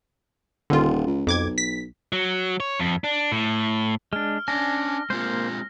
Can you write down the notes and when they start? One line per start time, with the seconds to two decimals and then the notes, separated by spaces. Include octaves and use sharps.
0.70 D#1 D3 F4
1.06 C#2
1.27 B1 F2 D6 G#6
1.58 B6
2.12 F#3
2.60 C#5
2.79 F2
3.04 D4
3.32 A2
4.13 G#3 D4 F6
4.48 C#4 D4 D5 G#5 A#6
5.10 G#3 A#3 C4 F4 C5